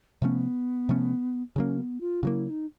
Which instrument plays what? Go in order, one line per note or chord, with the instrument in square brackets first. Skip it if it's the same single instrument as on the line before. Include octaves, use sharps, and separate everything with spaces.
[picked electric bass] C3 F3 A3 C#4 [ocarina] B3
[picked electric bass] C3 F3 A3 C#4
[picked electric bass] C#3 F#3 A#3 [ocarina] C#4 D4
[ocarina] B3
F4
[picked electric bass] C#3 F#3 A#3 [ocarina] E4 F4
[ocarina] E4
D#4